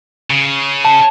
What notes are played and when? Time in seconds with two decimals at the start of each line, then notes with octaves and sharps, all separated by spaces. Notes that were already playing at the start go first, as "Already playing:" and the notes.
0.30 C#3
0.85 A5